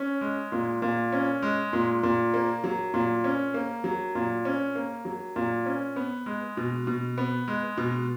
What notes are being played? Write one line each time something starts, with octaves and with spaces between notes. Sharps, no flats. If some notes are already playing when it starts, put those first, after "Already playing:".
Already playing: C#4
G#3
A#2
A#2
C#4
G#3
A#2
A#2
A#3
F#3
A#2
C#4
A#3
F#3
A#2
C#4
A#3
F#3
A#2
C#4
B3
G#3
B2
B2
B3
G#3
B2